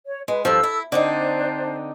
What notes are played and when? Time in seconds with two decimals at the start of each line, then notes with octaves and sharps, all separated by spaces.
0.07 C#5
0.28 G#3 B4
0.45 G2 F3 A4 E6
0.63 E4
0.92 D3 C4 D4 D#4 C5